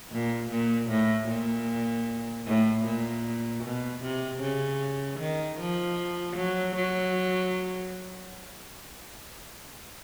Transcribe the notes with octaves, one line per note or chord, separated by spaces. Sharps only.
A#2
A#2
A2
A#2
A2
A#2
B2
C3
C#3
D#3
F3
F#3
F#3